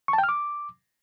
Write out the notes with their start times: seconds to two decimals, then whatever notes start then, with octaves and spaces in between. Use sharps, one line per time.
0.08 C#6
0.13 A5
0.18 G5
0.24 F6
0.29 D6